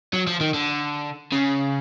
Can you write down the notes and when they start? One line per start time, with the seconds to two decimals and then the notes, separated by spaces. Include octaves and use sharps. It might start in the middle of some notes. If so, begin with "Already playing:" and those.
0.13 F#3
0.27 F3
0.40 D#3
0.54 D3
1.32 C#3